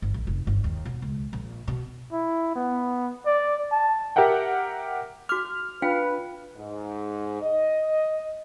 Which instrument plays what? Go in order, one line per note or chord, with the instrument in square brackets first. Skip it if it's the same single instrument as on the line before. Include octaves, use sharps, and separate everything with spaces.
[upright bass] G1
A#1
F1
G1
D#2
B2
C#2
A#1
B2
[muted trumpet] E4
B3
D5
A5
[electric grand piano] G4 A#4 E5 F#5 G5
[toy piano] F#4 D6 [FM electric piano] F6
[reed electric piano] D4 [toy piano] F4 F5 G5 [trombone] B4
[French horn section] G#2
D#5